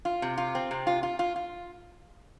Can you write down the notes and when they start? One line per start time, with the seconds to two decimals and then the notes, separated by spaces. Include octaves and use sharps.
0.05 F4
0.22 C3
0.37 F4
0.55 C4
0.71 C3
0.87 F4
1.03 F4
1.19 F4
1.36 F4